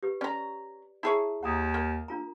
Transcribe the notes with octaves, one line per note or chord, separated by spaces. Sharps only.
G4 B4
C#4 D5 A#5
E4 G#4 C#5 A5 A#5
D#2 F#5 A#5 D#6
A#3
D4 F4 A#5